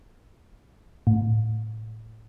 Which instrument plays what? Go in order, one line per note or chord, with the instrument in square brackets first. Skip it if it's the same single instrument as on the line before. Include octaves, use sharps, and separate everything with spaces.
[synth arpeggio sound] A2